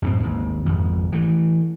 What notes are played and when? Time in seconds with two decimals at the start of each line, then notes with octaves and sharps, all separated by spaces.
0.02 F#2 A2 A#3 C4
0.23 G#1 D#2
0.66 G#1 F2
1.12 E3 A3